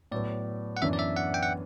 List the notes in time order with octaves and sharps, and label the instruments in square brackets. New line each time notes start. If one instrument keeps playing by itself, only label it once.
[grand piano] A2 F#3 B3 [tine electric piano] D5
[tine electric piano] F#5
[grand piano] F#2 E3 B3 D4 [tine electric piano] E5
[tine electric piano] D5
E5
F#5
G5
F#5